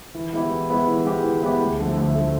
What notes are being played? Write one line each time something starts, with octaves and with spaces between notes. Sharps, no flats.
E3
G#3 B3 E4 G4
E3
G#3 B3 E4 G4
E3
G#3 B3 E4 G4
E3
G#3 B3 E4 G4
D2
D3 F3 A3
D2
D3 F3 A3